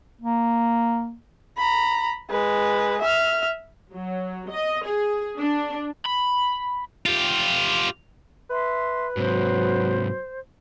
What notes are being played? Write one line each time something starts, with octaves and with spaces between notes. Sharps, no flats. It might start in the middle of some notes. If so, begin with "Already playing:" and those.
A#3
A#5 B5
G#3 B4
E5 F6
F#3
D#5
G#4
D4
B5
F4 G4
B4 E5 C6
G#2 C3 F#3 C5